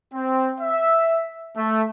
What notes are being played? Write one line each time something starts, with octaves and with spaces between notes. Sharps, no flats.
C4
E5
A3